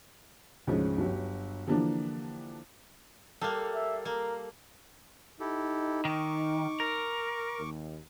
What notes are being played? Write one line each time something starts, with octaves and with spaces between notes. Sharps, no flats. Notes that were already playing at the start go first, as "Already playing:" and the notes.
D2 G#2 C#3 F3 G#3 C#4
G1 F#3 G4
D3 E3 F3 G3 A#3 D4
G3 A#3 A4 F5
E5
A#3 A#4
D#4 E4 G4 A4
D#3 C#6 D6
A#4
D#2